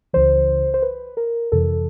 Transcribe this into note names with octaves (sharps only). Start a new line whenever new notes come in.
C#2 C#3 E3 C5
C5
B4
A#4
F2 C3 E3 A4